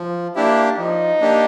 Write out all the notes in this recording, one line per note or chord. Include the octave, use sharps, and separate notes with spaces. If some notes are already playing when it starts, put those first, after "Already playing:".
Already playing: F3
A#3 D4 E4 G4
F3 D#4
A#3 D4 G4